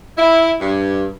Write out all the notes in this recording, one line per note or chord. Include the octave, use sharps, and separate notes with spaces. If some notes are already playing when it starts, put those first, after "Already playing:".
E4
G2